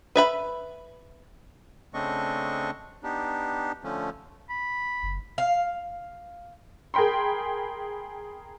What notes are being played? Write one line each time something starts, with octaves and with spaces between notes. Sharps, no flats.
B4 E5 B5
C#3 A3 C4 D4 D#5 C#6
B3 D4 D#4 G4
D3 F3 A3 C#4
B5
F#1
F5
G#4 A#4 G5 B5 C6